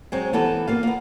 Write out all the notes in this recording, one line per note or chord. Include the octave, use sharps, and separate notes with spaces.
F#3 G#3 C4
E3 B3 G4 A4
A#3 F4 F5
A#3 B3